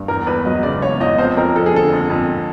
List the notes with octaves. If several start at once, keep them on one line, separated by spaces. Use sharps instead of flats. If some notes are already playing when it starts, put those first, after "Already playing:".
Already playing: G2
E2 A#4
E2 B4
F#3 D#5
C#3 D5
E2 C#5
E2 D#5
F2 C5
F2 A#4
F3 A4
G#4
D3 A4
F2
F2